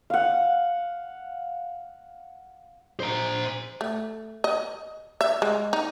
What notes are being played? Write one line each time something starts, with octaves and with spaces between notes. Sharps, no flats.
F5 F#5
C5 A#5
A3
D#5
E5
G#3
D#4